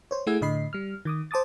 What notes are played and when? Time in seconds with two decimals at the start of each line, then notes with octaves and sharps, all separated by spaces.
0.11 C5 C#5
0.27 A3 E4 G#4 F#5 E6 G#6
0.41 A2 D3 D#5 B5 C7
0.73 G3 F6
1.05 D#3 D6 D#6
1.31 C5 A5 D6 D#6 A6